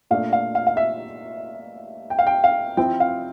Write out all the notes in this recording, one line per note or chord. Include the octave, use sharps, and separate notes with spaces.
A#2 A3 D4 F5
F5
F5
F5
E5
G5
F5
G5
F5
F3 C4 E4 G5
F5